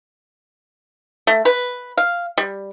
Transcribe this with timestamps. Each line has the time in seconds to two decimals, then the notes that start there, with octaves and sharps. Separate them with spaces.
1.27 A3
1.45 B4
1.97 F5
2.38 G3